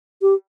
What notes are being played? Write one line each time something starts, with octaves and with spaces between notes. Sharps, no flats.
G4